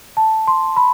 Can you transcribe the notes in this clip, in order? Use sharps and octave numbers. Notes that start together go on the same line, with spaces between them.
A5
C6
B5